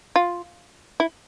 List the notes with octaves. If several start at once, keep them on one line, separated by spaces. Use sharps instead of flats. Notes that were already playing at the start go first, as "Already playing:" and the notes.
F4
E4